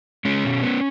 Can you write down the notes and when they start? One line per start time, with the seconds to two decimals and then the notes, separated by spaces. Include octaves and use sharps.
0.25 G#3 C#4
0.45 B2
0.63 B3